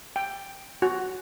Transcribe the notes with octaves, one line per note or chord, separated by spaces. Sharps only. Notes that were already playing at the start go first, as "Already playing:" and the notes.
G5
F#4